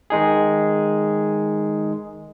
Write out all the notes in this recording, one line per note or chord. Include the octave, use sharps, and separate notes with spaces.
D#3 G#3 D#4 G#4